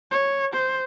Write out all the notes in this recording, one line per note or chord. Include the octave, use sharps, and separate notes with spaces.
C#5
C5